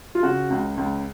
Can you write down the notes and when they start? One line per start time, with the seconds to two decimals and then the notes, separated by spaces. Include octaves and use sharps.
0.15 F4
0.23 C#3 F#4
0.50 C#2
0.77 C#2